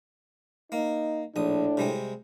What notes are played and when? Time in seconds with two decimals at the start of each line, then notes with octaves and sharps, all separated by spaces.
0.72 A#3 D#4
1.36 A#1 A2 D4 D#6
1.77 C3 G3 G#3